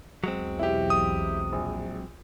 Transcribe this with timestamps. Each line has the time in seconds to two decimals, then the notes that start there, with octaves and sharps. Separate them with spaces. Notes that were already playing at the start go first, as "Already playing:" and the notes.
0.24 B1 E2 F#3 G#3 C4
0.59 E4 G4
0.90 D#6
1.52 A#1